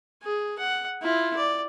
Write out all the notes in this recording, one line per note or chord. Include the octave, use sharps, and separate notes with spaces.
G#4
F#5
E4 F4
D5